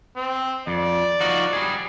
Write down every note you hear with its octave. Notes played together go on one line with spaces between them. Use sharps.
C4
F2 D5
F3 D#4 F#4
G3 G#4